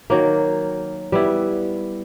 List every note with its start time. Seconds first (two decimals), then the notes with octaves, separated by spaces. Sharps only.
0.10 D#3 F#3 A#3
1.12 G3 B3 E4